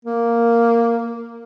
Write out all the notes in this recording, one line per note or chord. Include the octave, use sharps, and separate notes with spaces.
A#3